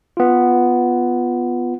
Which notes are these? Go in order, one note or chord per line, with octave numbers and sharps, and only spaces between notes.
B3 F4